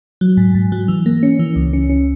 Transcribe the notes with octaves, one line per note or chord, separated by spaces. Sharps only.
F#3
G#2
G#2
F#3
E3
A#3
C#4
E3
C#2
C#4
C#4